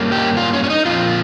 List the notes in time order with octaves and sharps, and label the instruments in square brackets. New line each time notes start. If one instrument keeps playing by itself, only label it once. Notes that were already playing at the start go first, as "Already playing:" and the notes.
Already playing: [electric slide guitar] G2 G3 A#3 C#4
G4
F4
C#4
C#4
D#4
A#2 F3 C4 F4